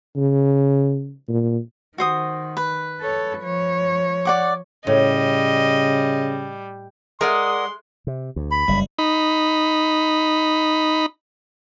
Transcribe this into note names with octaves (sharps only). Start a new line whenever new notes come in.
C#3
A#2
D#3 F#4 C5 D#6
B4
A4 C#5
F3 C#5
D5 F#5 D6
A2 C#3 G3 D#5
G#3 A#4 D5 F#5 C6 D#6
C3
D2
B5
F#1 G2 G3
D#4 B5